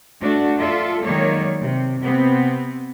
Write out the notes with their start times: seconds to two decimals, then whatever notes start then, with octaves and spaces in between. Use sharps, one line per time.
0.21 A3 D4 F#4
0.59 F4 A4 D5 E5
1.03 D#3 F#3 G#3 A#3 C#5 D5
1.62 C3
2.00 C3 B3 C4